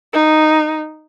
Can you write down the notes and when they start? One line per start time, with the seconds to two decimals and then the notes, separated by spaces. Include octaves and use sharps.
0.13 D#4